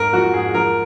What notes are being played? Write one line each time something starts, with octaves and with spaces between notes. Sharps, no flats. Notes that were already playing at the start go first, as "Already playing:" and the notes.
Already playing: G#2 A#4
F3 F#4
G#2 G#4
F3 A#4